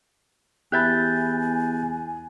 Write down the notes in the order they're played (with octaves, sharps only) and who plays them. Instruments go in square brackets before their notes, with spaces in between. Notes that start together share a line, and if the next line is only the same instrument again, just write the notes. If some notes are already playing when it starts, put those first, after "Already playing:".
[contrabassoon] E2 [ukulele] G4 E5 B5 [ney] G#5 [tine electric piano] F#6 G6 A6